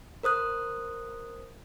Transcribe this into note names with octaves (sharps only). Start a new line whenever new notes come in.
A#4 C5 D#6 F#6